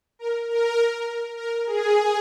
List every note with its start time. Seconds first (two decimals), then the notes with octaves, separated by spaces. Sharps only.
0.19 A#4
0.49 A#4
1.37 A#4
1.66 G#4